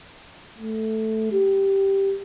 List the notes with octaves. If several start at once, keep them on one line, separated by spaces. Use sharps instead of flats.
A3
G4